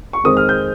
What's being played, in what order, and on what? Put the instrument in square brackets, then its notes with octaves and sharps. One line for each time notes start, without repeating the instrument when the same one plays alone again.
[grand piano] C#6
F2 D#3 G#3 C4 D#6
F6
G6